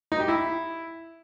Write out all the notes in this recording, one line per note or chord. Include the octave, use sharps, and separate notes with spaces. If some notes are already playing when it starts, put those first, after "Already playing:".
D#4
G4
E4